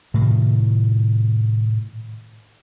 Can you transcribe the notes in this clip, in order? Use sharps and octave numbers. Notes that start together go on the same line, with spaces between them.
A2 C3 D#3